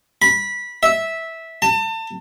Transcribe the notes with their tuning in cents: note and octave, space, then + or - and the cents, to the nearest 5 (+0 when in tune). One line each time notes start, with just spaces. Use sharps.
B5 -20
E5 -10
A5 +30